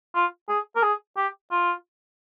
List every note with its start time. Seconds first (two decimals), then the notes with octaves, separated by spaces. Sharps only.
0.15 F4
0.49 G#4
0.76 A#4
0.83 G#4
1.17 G4
1.51 F4